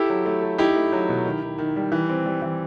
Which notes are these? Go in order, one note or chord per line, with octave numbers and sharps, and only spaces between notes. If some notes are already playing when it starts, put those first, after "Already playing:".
Already playing: E4 G4 A4
F#3
A3
A4
D#4 E4 G4
A3
F#3
B2
D#3
D#3
D#3
G3
E3
C4
G3
E3